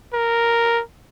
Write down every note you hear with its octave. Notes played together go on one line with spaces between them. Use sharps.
A#4